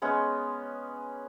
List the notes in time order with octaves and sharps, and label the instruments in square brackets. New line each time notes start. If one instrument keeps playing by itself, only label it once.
[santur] G#3 B3 C#4 C#5